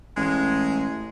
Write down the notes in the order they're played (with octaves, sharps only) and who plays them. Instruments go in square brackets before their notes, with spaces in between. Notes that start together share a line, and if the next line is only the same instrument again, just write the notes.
[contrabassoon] A1 [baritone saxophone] G#3